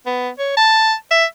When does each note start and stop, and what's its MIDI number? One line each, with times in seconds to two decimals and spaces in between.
0.06 0.30 59
0.39 0.55 73
0.57 0.94 81
1.11 1.25 76